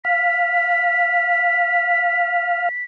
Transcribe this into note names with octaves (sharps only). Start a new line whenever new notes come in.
F5 B6